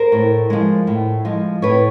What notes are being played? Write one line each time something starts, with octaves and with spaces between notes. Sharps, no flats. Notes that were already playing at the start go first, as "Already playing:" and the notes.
Already playing: A#4 C5
A2
F3 G#3
A2
F3 G#3
A2 B4 C#5